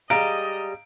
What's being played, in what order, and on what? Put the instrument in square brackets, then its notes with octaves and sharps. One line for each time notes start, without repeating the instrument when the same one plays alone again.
[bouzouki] G3 G#3 [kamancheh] D#5 [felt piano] F5 A#5 D7